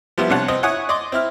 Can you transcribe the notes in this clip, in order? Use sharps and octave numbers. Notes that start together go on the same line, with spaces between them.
F3 G3 B3 E4
C2 C3 D4 C#5 F#5 A5
C4 D#5
E4 C#5 F#5 G#5 C#6 D#6
D5 D#5 C6 D6
C4 E4 F6